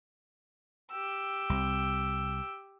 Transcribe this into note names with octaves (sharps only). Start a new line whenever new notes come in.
G4 E6
C2 C3